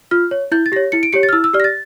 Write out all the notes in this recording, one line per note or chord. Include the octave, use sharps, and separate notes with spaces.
F4 F6
C#5
E4 G6
A6
G4 C#5 A#6
E4 C#7
D7
G4 C#5 C#7
A6
F6
E4 E6
E6
G4 D5 F6
A#6
A6